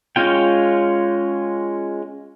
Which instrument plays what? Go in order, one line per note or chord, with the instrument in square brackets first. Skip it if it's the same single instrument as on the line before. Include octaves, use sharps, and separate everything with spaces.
[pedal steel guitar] G#3 C#4 F4 G5